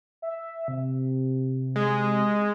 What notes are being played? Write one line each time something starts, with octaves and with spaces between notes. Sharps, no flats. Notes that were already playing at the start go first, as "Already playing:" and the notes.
E5
C3
G#3